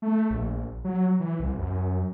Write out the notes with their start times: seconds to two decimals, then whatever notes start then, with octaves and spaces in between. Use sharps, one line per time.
0.02 A3
0.30 A#1
0.84 F#3
1.20 E3
1.39 C2
1.58 F#2